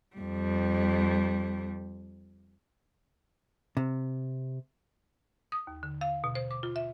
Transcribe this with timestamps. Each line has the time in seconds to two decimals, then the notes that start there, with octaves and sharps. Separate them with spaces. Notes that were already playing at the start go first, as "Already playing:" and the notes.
0.16 F2 G3
3.77 C3
5.52 D#6
5.67 D#2
5.83 D3
6.01 F5
6.24 B2
6.35 C5
6.51 D6
6.63 F4
6.76 E5